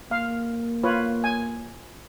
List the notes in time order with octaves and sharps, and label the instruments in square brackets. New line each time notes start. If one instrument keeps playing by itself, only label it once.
[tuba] A#3 [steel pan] F5
[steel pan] F4 B4 C#5
G#5